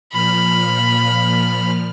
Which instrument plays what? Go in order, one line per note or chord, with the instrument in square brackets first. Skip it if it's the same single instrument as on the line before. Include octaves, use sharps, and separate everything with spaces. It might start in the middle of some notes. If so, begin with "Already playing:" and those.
[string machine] A#2 F3 F6 [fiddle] B5